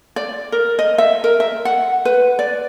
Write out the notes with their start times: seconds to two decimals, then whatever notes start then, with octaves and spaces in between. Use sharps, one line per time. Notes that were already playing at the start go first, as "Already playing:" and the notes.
0.16 D5
0.52 A#4
0.79 D#5
0.98 E5
1.24 A#4
1.40 E5
1.65 F#5
2.05 B4
2.39 D5